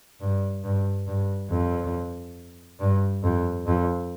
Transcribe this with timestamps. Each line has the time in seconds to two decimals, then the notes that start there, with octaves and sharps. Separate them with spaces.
0.21 G2
0.64 G2
1.07 G2
1.50 F2
2.80 G2
3.24 F2
3.67 F2